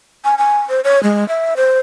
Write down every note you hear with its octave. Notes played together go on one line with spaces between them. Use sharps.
G#5
G#5
C5
C#5
G#3
E5
C5